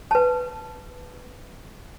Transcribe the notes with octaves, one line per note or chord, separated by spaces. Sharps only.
B4 A5